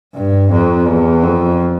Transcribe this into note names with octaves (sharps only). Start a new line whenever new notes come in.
G2
F2
E2
F2